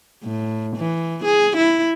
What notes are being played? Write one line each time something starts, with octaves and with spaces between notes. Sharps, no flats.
A2
E3
G#4
E4